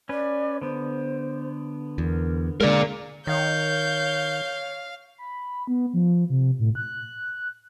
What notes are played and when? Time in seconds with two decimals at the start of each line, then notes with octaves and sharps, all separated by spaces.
0.09 C#4 B4 D5
0.61 D3 B3 C5
1.98 E2 A#4
2.61 D3 G#3 A#3 A#4 D5
3.27 D#3 C#5 F5 G6
5.18 B5
5.67 B3
5.94 F3
6.30 C3
6.59 A2
6.75 F#6